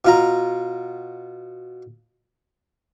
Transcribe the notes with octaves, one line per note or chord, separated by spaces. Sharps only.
B2 F4 A#5